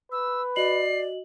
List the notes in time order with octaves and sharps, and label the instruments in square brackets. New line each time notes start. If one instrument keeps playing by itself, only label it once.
[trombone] B4 [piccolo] E6
[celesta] F#4 D#5 F#7 [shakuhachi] D5 [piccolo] C7